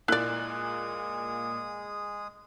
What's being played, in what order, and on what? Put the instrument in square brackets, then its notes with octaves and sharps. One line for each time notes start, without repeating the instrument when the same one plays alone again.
[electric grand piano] A#2 A#3 [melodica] G#3 G#4 D#6 [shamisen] E4 D5 [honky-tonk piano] F#6